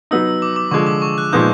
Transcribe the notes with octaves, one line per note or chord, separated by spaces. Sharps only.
F#3 B3 D#4 E6
D6
D6
D3 F3 G#3 C#6
D6
C#6
F#6
A#2 F3 G#3 B3 D#4 G6